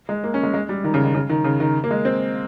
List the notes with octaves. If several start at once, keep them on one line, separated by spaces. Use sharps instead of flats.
G#3
A#3
C#4
G#3
G#3
G3
D#3
C#3
D#3
C#3
D#3
C#3
D#3
A#3
G#3
C4